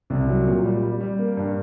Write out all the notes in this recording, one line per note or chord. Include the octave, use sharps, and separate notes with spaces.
C2
F#3
A#2
G3
G3
G3
A#3
G2